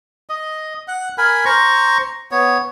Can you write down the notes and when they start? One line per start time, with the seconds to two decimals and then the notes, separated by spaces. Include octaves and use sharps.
0.29 D#5
0.88 F#5
1.18 A#4 G#5 B5
1.45 C5 A#5 C#6
2.31 B3 C#5